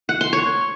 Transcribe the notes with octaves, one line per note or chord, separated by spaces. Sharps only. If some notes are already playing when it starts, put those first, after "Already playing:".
F#5
C6
C#5